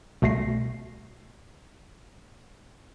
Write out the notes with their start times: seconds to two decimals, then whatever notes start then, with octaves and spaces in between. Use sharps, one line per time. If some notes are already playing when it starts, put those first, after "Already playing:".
0.22 C2 B2 A3 A#6 C7